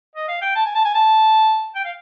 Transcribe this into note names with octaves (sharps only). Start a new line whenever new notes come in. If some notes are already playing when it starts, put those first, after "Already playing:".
D#5
F5
G5
A5
G#5
A5
G#5
A5
G5
F5